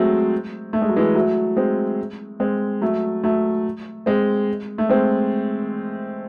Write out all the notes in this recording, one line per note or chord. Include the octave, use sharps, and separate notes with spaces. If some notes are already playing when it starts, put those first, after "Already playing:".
Already playing: F#3 G#3 A3 C4
A3
G#3
F#3
E3 G#3
F#3 A3
G#3 C4
G#3 C4
F#3 A3
F#3 A3
G#3 C4
A3
G#3 C4